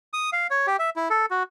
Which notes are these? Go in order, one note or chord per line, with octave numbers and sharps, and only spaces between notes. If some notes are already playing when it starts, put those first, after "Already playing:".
D#6
F5
C#5
G4
E5
E4
A4
F#4